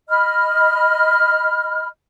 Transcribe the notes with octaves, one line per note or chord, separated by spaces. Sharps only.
D#5 B5 F6